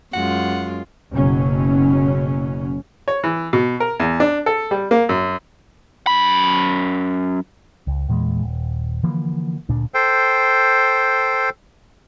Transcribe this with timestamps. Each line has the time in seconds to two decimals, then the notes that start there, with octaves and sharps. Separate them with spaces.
0.14 F#2 G#3 F4 F#5
1.12 F#1 F#2 B2 F#3 C#4
3.08 C#5
3.24 E3
3.53 B2
3.80 A#4
4.00 E2
4.20 D4
4.46 A4
4.71 G3
4.91 A#3
5.09 F#2
6.07 F#2 B5
7.87 C#2
8.09 E2 A#2 E3 G#3
8.43 D#1
9.03 D3 E3 F3 A#3
9.69 D2 A#2 D4
9.94 A4 C5 G5